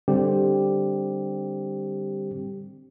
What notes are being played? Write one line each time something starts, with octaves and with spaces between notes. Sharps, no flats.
D3 G3 C4 G4